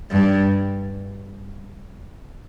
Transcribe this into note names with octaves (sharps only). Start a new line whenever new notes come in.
G2